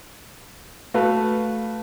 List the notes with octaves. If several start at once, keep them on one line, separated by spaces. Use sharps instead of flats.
A3 F#4 B4 F5